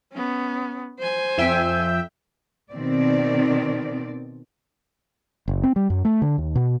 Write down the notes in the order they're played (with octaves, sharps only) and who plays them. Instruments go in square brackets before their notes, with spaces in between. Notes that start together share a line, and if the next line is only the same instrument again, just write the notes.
[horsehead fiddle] B3 C#4
C5 G#5
[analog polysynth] F2 E5 G5
[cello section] B2 D#3 C4 D5
[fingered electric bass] F#1
C4
G3
F#2
A3
D3
D#2
B2